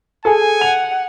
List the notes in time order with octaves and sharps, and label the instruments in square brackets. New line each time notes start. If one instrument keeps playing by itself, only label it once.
[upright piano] G#4 A4 [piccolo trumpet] G#5
[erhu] F#5 [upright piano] F7